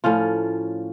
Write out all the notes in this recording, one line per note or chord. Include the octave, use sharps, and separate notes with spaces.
A2 F3 C#4 F4